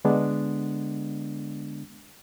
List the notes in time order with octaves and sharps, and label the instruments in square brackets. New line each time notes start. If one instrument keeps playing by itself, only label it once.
[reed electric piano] D3 G#3 B3 D4